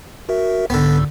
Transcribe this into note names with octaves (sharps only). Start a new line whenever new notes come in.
F#4 A#4 E5
C2 G#2 D3 B3 E6